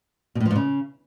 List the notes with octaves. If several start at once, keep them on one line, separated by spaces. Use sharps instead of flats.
B2
A2
F3
G#2
C#3